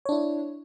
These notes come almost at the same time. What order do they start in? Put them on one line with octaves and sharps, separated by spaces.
C#5 D4 E4